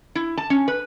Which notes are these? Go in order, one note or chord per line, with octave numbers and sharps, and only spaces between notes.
E4
A5
C#4
B4